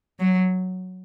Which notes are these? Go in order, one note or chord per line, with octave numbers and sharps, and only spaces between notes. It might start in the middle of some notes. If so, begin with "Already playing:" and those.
F#3